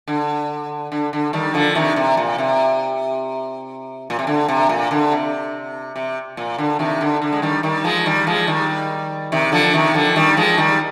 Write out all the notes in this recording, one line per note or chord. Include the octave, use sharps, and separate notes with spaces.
D3
D3
D3
D#3 G3
D3 F3
C3 D#3
C3
A#2
C3
A#2
C3
D3
C3
A#2
D3
C3
C3
A#2
D3
C3 D#3
D3
D3
G#3
D#3 G3
D#3 G3
F3 G#3
D#3 G3
F3 G#3
D#3 G3
C3 D#3
D3 F3
C3 D#3
D3 F3
D#3 G3
F3 G#3
D#3 G3